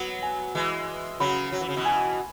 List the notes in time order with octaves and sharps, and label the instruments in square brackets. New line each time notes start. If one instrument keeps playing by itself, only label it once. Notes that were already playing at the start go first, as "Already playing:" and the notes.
Already playing: [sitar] F#3 B3
[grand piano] G#5
[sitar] E3 G#3
[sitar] C#3 F#3 [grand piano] B5
[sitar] F#3
E3
C#3
B2 E3
[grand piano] G#5